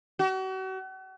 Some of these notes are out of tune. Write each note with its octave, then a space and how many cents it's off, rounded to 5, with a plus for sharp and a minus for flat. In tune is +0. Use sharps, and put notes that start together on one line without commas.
F#4 +40